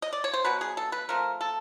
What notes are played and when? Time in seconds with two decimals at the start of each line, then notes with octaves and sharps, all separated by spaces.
0.02 D#5
0.13 D5
0.24 C#5
0.34 C5
0.45 B2 F#3 B4
0.61 G#4
0.77 A4
0.92 B4
1.09 F3 A3 C4 A#4
1.41 A4